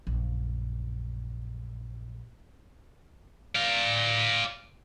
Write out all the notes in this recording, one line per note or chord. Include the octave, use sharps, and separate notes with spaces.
A#1 F#2
D5 F5